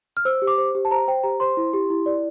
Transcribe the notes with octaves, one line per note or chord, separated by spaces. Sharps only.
F6
C5 E6
G4
D6
C5
G4
A5
C5 A#5
C5 G5
G4 A#5
C5 C6
E4
G4
E4
D5